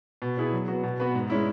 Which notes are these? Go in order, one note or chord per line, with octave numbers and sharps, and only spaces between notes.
B2
B3 E4 G#4
F#3
B3 F#4
B2
B3 F#4 B4
G#2
G#3 C#4 E4